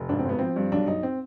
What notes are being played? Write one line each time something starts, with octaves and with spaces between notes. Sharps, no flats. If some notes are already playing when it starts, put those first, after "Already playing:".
Already playing: F1
G#1 D4
C4
G#1 B3
F3 C4
G2
B1 D4
B1 D#4
C4